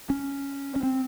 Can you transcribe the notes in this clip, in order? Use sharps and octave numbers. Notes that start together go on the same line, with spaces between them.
C#4
C#4
C4